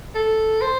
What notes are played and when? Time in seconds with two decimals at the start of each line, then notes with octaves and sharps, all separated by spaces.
0.15 A4
0.61 C5